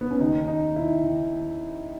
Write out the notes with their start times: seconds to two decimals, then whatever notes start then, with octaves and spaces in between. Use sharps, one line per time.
0.01 B3
0.11 C#4
0.20 D#2 D#3 D#4
0.48 D#4
0.76 E4
1.03 D#3